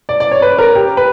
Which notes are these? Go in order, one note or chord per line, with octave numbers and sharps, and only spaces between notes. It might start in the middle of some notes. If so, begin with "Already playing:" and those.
D5
D5
C#5
B4
A#4
G4
B4